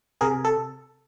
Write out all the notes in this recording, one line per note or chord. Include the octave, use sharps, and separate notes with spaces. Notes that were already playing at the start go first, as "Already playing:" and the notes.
C3 G#4 A#4
A4